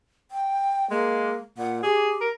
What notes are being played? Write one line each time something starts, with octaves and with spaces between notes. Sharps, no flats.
G5
G#3 A#3
A#2 F#5
G4 G#4
A#4